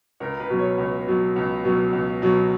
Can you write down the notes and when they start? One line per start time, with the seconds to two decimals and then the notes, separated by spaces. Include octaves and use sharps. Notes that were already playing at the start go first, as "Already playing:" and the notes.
0.20 C#2 A#4
0.40 B4
0.50 B2 F#3
0.59 C#5
0.78 C#2
1.07 B2 F#3
1.36 C#2
1.64 B2 F#3
1.93 C#2
2.22 B2 F#3